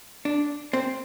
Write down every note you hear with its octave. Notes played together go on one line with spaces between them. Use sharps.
D4
C4